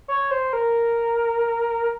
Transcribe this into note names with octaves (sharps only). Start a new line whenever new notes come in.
C#5
C5
A#4